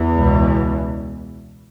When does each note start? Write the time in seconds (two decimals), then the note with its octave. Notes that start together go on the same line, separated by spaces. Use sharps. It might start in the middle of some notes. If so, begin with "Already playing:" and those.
Already playing: E2 E3
0.14 C#2 B2